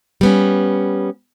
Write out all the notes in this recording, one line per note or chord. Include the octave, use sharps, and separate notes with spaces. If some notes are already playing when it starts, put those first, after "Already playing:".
G3 B3 C#4